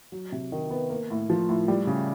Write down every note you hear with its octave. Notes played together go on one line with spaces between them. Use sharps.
F#3
C3
D#3
B3
A#3
A2
F3
A2
G3
C#3